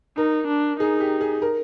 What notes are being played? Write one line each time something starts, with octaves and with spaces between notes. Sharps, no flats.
D#4 A#4
D4
D#4 G#4
G4
G#4
A#4